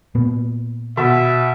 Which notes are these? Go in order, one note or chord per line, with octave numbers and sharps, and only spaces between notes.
A#2 B3
B2 E5